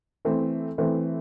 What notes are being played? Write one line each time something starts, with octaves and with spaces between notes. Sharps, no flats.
E3 A3 C4
E3 A3 C4